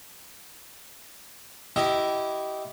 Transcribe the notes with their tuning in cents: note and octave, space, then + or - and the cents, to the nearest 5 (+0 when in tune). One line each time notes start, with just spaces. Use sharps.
E4 +0 G4 -20 D#5 +0